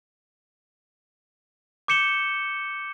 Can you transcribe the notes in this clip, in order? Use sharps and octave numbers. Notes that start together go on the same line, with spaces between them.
D6 G6 C#7 E7 G7